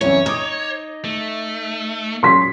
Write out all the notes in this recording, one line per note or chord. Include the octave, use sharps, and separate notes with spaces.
C2 F#2 E3 C#4 C#5
D#4 D6 D#6 G#6
A3
A#2 F#3 C#4 C6 B6